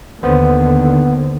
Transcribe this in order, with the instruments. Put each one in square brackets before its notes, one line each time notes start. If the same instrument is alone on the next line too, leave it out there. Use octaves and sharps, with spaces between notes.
[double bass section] D#2 D3 D#3 [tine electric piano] B3 C5